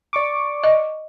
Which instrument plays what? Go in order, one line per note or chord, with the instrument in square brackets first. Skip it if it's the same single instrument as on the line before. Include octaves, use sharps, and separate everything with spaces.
[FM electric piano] D5 C#6 D6
[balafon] D#5